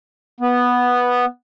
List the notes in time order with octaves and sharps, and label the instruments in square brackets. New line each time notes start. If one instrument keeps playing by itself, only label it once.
[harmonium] B3